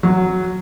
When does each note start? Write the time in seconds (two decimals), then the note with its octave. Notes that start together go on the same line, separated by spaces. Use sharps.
0.03 F#3